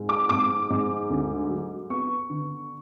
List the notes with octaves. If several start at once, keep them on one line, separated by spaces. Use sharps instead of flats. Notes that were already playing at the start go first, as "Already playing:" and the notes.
Already playing: G#2
D6
G#2 D6
G#2
D2
F#3
B3 C#6
D3